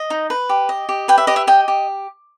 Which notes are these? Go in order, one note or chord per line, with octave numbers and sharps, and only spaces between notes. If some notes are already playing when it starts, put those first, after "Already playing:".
Already playing: D#5
D#4
B4
G4
D#5
G4
B4 G5
E5
G4 D#5
E5
D#5 G5
G4